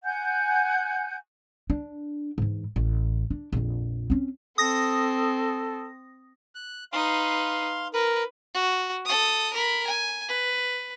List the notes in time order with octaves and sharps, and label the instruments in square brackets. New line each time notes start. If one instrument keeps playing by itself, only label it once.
[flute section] F#5 G#5 G6
[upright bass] D4
G#2 E3
A1
D4
A#1 F2
C4 C#4
[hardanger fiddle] C4 [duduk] A4 [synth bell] D#6 A#6
[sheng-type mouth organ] F#6
[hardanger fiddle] D#4 B4 [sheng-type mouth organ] F5 C6
[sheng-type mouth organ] A#4 [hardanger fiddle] B4
[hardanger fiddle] F#4
A4 D#6
A#4 B5
G#5
B4